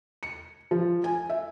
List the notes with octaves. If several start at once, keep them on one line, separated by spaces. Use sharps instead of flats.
C#7
F3
G#5
E5